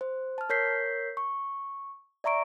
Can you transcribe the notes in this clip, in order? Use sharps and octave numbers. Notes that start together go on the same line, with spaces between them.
C5
A5 F6
A#4 C#5 G6 B6 C7
C#6
D5 E5 A#5 C#6 D7